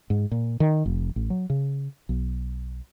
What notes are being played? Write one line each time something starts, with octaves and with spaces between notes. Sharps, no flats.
G#2
A#2
D#3
F1
A1
F#3
C#3
B1